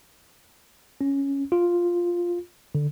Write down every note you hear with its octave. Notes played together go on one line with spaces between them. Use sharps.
C#4
F4
D3